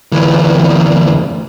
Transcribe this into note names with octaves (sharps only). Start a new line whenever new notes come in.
D2 E3